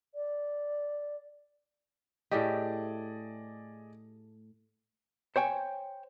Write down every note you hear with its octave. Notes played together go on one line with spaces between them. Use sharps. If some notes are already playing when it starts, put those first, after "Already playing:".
D5
A2 A3 G4 G#4 D5 D#5
C5 C#5 G5 G#5